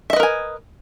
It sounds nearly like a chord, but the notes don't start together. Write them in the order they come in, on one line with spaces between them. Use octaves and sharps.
E5 D#5 B4 A#4 G#5